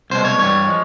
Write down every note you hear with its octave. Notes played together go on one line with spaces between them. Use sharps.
C2 B2 G#3 C5
C#5
G2 E3 G3 C#5
F3 G#3